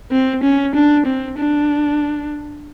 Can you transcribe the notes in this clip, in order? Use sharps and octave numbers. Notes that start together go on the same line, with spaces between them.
C4
C#4
D4
C4
D4